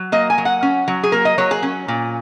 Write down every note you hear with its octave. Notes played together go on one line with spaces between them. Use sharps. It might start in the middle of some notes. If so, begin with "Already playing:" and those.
Already playing: F#3
A#3 D#5
G#5
F#3
F#5
C#4
F#3
G#4
A#3 A#4
D#5
F#3 C#5
G#4
C#4
A#2